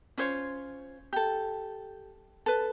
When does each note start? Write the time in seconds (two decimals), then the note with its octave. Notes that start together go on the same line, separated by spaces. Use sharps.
0.18 C#4 F4 C5 C#5
1.13 G4 A4
2.46 A4 B4